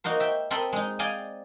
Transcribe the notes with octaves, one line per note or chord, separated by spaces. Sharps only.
A#3 D#4 F#4 A#4 C5
E5 G5
C4 A4 A#4 D#5 B5 C6
G#3 D#4
D5 D#5 F5 G5 G#5